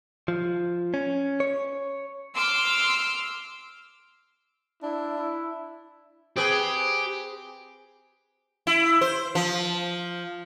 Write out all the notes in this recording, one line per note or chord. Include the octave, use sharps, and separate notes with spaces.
F3
C#4
C#5
C6 D6 E6 F6
D4 E4
E4
C4 G4 G#4 B4
E4
C5
F3